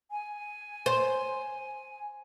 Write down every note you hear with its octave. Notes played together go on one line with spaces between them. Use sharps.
G#5
C5